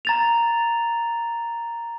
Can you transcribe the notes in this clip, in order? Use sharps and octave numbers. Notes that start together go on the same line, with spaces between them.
A#5 A6 F7